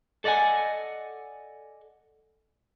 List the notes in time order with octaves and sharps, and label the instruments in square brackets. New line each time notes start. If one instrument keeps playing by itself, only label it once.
[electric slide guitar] A4 D5 D#5 F#5 G#5